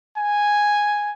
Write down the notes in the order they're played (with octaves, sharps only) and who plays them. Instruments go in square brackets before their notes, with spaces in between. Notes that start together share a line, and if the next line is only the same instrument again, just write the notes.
[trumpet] G#5